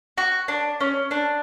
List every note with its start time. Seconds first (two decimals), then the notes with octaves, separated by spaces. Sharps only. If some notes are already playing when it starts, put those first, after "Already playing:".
0.18 F#4
0.48 D4
0.81 C#4
1.11 D4